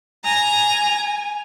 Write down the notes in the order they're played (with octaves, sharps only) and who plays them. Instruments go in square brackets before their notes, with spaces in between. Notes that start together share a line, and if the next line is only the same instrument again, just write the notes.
[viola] G#5 [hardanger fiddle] A#5